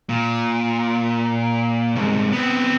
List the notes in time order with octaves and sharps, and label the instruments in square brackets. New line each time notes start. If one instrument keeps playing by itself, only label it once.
[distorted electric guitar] A#2
C2 G#2
B3 C4